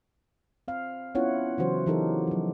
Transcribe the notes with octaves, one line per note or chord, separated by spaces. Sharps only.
C4 F5
B3 C#4 E4 F4 C#5 F#5
C#3 E3 F#3 F4 F#4 C5
E3 F#3 D#4 G4 A4 A#4
F3 F#3